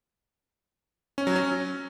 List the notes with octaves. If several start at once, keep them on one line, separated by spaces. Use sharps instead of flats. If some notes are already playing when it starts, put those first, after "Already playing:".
C#4
F#3
C#4